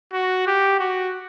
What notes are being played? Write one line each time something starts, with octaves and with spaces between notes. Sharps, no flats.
F#4
G4
F#4